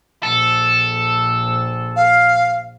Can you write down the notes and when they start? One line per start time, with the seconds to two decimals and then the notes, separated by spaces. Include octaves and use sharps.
0.23 A#1 A4
1.96 F5